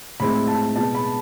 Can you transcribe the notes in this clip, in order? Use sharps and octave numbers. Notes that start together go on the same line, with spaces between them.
A2 G#3 C4 E4 B5
A5
B2 G#3 B3 A5
B5